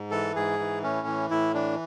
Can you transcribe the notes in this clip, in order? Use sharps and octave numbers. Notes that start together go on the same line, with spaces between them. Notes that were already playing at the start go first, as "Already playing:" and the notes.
Already playing: G#2
E3 A4
G#2 G#4
E3
A2 C#4
E3
A2 E4
E3 D4